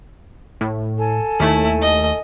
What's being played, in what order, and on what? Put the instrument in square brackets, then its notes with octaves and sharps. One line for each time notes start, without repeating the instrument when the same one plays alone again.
[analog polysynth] A2
[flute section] A4 G#5
[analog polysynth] D#2 A3 [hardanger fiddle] E4
[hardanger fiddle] D#5